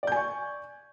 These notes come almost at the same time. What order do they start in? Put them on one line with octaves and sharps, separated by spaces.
D5 G6 G#5 C#6